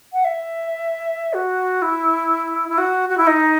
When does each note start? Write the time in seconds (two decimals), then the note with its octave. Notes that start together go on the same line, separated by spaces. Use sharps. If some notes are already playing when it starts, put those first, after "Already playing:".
0.13 F#5
0.24 E5
1.33 F#4
1.82 E4
2.69 E4
2.78 F#4
3.09 F#4
3.17 E4
3.27 D#4